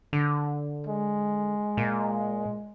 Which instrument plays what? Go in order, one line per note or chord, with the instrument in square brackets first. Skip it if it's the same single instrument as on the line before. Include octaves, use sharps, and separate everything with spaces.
[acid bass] D3
[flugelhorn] G#3
[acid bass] A#2